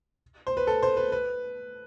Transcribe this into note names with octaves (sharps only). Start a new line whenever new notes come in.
C5
B4
A4
C5
B4
B4